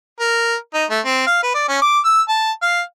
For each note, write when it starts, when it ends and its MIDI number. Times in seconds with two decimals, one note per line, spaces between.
0.20 0.55 70
0.74 0.85 63
0.90 1.00 57
1.05 1.25 60
1.27 1.43 77
1.43 1.51 71
1.54 1.65 74
1.68 1.80 61
1.82 1.98 86
2.05 2.21 88
2.29 2.51 81
2.62 2.81 77